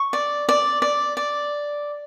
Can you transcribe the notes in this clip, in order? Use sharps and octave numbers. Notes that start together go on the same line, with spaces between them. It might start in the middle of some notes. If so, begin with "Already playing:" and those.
Already playing: C#6
D5
D5
D5
D5